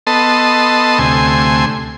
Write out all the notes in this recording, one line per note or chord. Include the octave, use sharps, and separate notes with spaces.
B3 A4 D#5 A5 C6
D2 C3 A3 G#5 C6